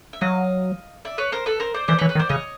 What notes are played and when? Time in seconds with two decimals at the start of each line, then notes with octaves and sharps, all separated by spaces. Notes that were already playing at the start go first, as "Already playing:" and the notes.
0.13 E5
0.21 F#3 D#5 F5
1.05 D5 E5
1.18 B4 C#5
1.32 A#4 C5
1.46 A4 B4
1.60 A#4 C5
1.74 C5 D5
1.88 E3 C5 D5
1.98 E3 B4 C#5
2.09 B4 C#5
2.15 D#3
2.19 C5 D5
2.29 C#3 C#5 D#5